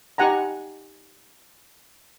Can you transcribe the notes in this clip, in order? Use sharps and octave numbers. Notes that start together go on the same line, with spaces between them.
D#4 G4 F#5 G#5 A#5